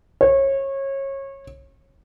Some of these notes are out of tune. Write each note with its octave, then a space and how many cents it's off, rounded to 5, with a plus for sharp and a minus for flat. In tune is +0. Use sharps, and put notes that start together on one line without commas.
C#5 -25